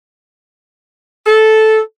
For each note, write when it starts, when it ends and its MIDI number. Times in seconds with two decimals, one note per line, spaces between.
1.26 1.79 69